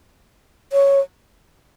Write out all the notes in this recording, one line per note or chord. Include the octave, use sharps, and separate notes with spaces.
C#5